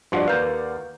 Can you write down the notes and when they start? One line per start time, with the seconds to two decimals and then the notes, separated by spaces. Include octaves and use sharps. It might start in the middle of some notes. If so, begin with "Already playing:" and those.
0.12 G2 F3 F#4 D5 F#5 C6
0.28 D#2 A#4 B4 F5 G6